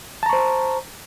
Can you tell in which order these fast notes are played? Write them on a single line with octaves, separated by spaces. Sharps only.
A5 A#5 C#6 C5